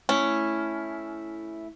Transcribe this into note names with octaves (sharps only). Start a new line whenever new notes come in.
A3 C#4 E4